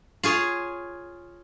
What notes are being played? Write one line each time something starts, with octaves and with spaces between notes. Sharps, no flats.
F4 G#4 C#5